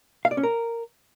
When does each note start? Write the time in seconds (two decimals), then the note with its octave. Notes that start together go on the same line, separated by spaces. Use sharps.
0.25 F5
0.31 D5
0.37 C#4
0.43 A#4